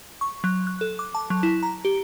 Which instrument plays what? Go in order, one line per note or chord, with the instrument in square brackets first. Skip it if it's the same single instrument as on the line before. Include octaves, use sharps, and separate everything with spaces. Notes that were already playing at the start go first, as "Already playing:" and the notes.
[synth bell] C#6
F#3
F#6
A4
D6
A5
F#3
E4
A#5
G4